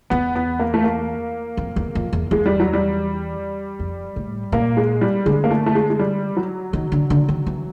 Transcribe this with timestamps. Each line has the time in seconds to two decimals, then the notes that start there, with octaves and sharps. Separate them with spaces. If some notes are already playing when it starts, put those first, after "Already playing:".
0.10 E2 B3
0.35 B3
0.59 A#3
0.74 A3
0.84 A#3
1.57 F2
1.76 E2
1.95 F2
2.13 E2
2.31 E2 G#3
2.46 G3
2.60 F#3
2.73 G3
3.79 F2
4.16 A2
4.52 A#2 A#3
4.77 G#3
5.01 G3
5.26 D3 G#3
5.44 A#3
5.50 A3
5.66 A3
5.75 G#3
5.90 G#3
5.99 G3
6.37 F#3
6.73 D#3
6.92 D3
7.10 D3
7.29 D#3
7.46 E3